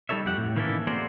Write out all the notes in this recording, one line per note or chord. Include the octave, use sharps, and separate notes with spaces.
G3 D#4 A4 C#5 E5
F2 G4 F#5
A2
D#3 E3 A#3 C#4 E4 A4
A#3 C4 F#4 G#4 C5 D5